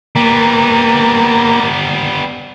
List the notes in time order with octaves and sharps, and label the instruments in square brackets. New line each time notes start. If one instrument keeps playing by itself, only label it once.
[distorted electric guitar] G3 B3 [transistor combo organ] A#3